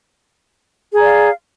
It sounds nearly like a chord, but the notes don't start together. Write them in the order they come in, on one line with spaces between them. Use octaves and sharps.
G#4 A#5 D5 F5